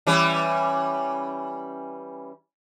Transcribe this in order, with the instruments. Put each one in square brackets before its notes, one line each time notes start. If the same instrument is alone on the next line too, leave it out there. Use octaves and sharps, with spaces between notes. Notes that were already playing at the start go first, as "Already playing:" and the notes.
[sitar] E3 G3 C#4